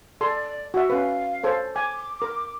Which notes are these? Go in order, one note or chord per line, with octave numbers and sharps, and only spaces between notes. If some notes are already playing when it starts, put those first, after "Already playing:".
A4 D5 C6
F#4 E5
C#4 B4 F5
A4 C5 C#5
G#5 D6
A#4